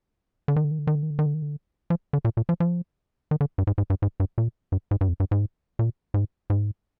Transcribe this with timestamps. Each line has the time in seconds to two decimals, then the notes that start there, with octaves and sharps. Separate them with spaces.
0.48 D3
0.56 D#3
0.64 D3
0.71 D#3
0.79 D3
0.87 D#3
0.95 D3
1.03 D#3
1.10 D3
1.19 D#3
1.26 D3
1.34 D#3
1.42 D3
1.90 F3
2.13 D3
2.25 A#2
2.37 A#2
2.49 F3
2.60 F3
3.31 D#3
3.41 D3
3.58 G2
3.67 G#2
3.78 G#2
3.90 G2
4.02 G#2
4.20 G2
4.38 A#2
4.72 G2
4.91 G#2
5.01 G2
5.08 F2
5.20 G2
5.31 G#2
5.79 A#2
6.14 G#2
6.50 G#2